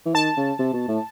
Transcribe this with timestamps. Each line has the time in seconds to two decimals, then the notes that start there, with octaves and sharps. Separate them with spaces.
0.05 E3
0.14 D#3 A5
0.37 C#3
0.59 C3
0.73 B2
0.88 A2